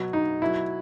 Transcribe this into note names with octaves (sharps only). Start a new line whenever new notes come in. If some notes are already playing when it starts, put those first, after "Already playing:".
Already playing: B2 F#3
D#4
B2 F#3 E4